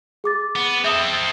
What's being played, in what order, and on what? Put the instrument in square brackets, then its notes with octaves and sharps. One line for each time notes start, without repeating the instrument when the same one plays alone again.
[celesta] G#4 D6 A6
[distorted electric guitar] B3
[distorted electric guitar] C4 A4 [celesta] E5 D#6